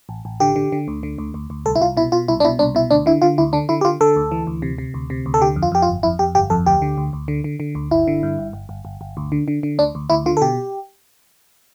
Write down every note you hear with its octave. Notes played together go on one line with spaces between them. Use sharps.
A1
A1
D3 G4
D3
D3
D2
D3
D2
D2
D2
C2 A4
E4
C2 F4
B2 E4
B2 F4
C2 E4
D4
B2 E4
C2 D4
B2 E4
D2 D4
D3 E4
D3 F4
D2 E4
D3 D4
D3 E4
G4
D3 F4
D3 A4
D2
E3
D2
C3
C3
D2
C3
D2
A4
D3 G4
F2
F4
F2 G4
F4
G1
F2 E4
F2 G4
G1 G4
F2 A4
D2 G4
D3
D2
D2
D3
D3
D3
D2
G1 E4
D3
G2
G1
G1
G1
G1
G1
D2
D3
D3
D3
D2 D4
D2
D2 E4
D3 F4
A4
B2 G4